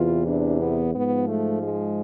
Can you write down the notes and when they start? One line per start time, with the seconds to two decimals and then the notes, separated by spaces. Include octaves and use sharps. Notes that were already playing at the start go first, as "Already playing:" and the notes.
Already playing: E2 C3 E3 F4
0.27 D4
0.60 B3
0.95 G#2 F3 B3
1.28 A3
1.63 G#3